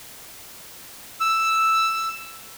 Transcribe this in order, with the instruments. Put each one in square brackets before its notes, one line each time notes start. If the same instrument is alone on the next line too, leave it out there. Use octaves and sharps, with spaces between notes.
[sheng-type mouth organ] E6